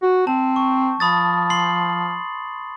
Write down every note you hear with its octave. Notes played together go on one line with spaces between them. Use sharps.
F#4
C4 A5
C#6
F3 B5 D#6 A6
C6 C7 F#7